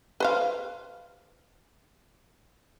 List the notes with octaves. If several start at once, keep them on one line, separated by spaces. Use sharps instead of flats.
B4 C5 F5